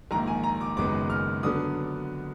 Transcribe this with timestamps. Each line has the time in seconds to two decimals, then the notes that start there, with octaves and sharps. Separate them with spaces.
0.11 A#1 G#2 D#3 A#3 A#5
0.27 G#5
0.43 A#5
0.61 D6
0.77 F#1 F#2 D#3 G#3 B3 D6
1.10 F6
1.43 D3 F#3 B3 D4 D#6